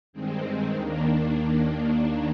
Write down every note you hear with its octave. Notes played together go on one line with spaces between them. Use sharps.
G2 D#3 G#3 C4
D#2 D#3 A#3 D4